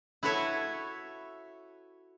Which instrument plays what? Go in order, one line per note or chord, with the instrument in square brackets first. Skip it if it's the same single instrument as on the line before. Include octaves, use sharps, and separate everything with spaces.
[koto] E4 F#4 A4 B4 C#5 E5